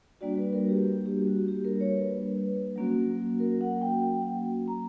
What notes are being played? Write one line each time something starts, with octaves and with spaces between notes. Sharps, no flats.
G3 A#3 D4 F#4 D5
B4
A#4
G4
G4
G4
F#4
G4
A#4
C#5
B4
F#3 A#3 C#4 F#4
A#4
F#5
G5
A#5